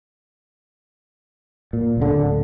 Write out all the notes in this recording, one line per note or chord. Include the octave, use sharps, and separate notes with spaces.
A#2
D1 D3